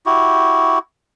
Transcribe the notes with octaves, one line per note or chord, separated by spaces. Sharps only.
E4 F#4 G4